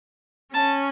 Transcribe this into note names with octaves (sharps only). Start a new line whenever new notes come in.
C#4 A5